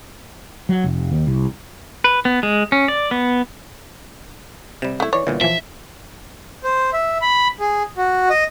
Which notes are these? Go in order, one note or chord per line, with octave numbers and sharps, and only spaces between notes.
F#3
F1
D#2
C2
B4
B3
G#3
C#4
D5
B3
C3 G3 E7
A3 E4
E3 C#5 D5
G1 A#2 D3 E3
A#2 E3 F3 E5
C5
E5
B5
G#4
F#4
D#5